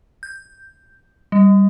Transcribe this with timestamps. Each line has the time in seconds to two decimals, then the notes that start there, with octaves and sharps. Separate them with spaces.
0.23 G6
1.32 G3